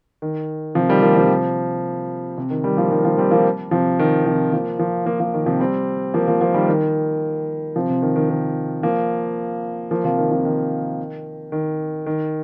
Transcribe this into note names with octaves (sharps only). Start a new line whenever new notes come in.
D#3
C3 F3
D#3 G3
F3 A#3
C3 F3
C3
D#3
D#3 G3
F3 A#3
D#3 G3
F3 A#3
G3 C4
F3 A#3
C3 F3
D#3
C3 F3
F3 A#3
F3 A#3
F3 A#3
F3 A#3
D#3
C3 F3
G3 C4
F3 A#3
F3 A#3
F3 A#3
D#3 G3
D#3
C3 F3
C3
D#3
D#3
D#3
F3 A#3
F3 A#3
C3 F3
D#3
C3 F3
D#3
D#3
D#3